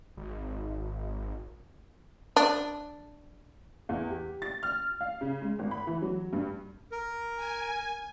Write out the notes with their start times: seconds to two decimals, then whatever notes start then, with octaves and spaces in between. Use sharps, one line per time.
0.17 G#1
2.36 D4
3.89 E2
4.10 G4
4.42 A6
4.63 F6
5.01 F5
5.21 C#3
5.41 G#3
5.59 G#1
5.71 B5
5.87 E3
6.02 F#3
6.33 G2
6.92 A#4
7.36 G#5